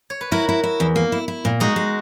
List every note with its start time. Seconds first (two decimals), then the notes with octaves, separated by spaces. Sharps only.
0.10 C#5
0.21 B4
0.32 E4 F#4 A#4
0.49 E4
0.64 E4
0.80 E2
0.96 A#3
1.12 E4
1.28 E4
1.45 A#2
1.60 G#3 D#4 F#4
1.76 G#3